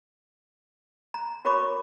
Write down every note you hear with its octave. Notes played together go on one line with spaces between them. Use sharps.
A#5
F#4 A#4 C#5 B5 C#6 D6